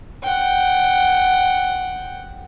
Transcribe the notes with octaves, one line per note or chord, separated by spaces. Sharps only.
F#5 G5